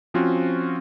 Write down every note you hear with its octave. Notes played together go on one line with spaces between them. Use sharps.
F3 C4 C#4 F4 F#4